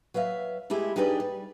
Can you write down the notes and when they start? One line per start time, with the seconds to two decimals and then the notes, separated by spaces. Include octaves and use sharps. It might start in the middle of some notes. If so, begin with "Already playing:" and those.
0.14 F#3 B4 E5 F5
0.70 G#3 A3 E4 G4 G#4
0.96 D4 D#4 G4 G#4 B4 D5
1.20 G3